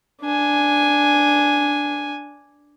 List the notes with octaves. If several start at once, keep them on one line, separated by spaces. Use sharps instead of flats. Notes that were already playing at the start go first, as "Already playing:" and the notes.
D4 G#5